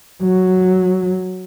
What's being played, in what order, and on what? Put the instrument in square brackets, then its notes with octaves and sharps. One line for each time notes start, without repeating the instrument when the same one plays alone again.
[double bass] F#3